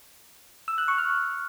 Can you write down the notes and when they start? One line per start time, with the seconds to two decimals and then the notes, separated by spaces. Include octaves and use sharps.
0.68 E6
0.78 F#6
0.88 C#6
0.98 F6